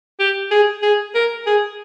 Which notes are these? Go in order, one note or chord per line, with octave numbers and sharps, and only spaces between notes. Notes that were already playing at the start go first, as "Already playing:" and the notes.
G4
G#4
G#4
A#4
G#4